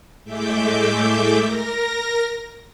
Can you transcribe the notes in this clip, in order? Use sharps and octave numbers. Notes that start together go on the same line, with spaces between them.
A2 G#3 A3 E5 D6 G6
A#4 A#6